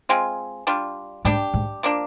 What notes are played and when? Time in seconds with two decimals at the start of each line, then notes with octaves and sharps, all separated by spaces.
0.09 G#3 C4 F4
0.67 G3 D4 F4
1.25 G#2 G3 D4 G4
1.54 G#2
1.83 F3 A#3 D4